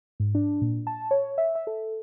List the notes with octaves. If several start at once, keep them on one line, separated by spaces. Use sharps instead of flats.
G#2
D4
A#2
A5
C#5
E5
E5
A4